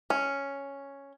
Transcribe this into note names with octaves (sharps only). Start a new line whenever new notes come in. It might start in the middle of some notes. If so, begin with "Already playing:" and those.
C#4